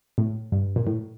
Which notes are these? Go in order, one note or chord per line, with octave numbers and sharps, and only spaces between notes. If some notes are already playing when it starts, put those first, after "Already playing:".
A2
G2
A#2
A2